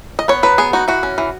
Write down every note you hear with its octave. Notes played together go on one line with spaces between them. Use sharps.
D#5
B3 C#5
F#3 B4
B3 G#4
D#4 F#4
E3 F#4
C#4
E3